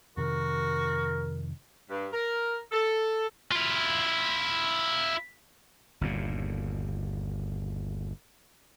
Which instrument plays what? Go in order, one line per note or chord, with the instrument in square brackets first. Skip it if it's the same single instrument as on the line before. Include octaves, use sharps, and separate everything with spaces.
[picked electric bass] F2 C3 D#3 [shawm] F#4 [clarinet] A#4
[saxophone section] G2
A#4
A4
[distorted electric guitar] E4 F4
[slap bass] G1 D#2 A#2